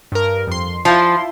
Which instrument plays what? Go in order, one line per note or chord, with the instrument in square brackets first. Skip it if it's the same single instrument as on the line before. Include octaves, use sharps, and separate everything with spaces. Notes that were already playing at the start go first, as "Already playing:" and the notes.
[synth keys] G2 A#4
F2 C6
[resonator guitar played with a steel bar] F3 [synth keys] E4 F4 C6